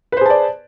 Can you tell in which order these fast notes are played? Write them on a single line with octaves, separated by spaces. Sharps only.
B4 C5 G#4 A5 D5